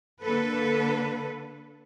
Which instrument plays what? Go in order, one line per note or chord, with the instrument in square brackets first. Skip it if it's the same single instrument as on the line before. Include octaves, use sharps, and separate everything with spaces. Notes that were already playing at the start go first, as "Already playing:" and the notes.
[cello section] D3 A#3 A4 B4